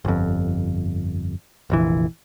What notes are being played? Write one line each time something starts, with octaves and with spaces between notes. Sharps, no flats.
G1 F2
F1 A#1 E3